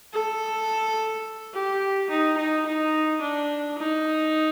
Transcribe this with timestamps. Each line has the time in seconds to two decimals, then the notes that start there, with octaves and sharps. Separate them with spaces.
0.13 A4
1.54 G4
2.10 D#4
2.38 D#4
2.66 D#4
3.22 D4
3.78 D#4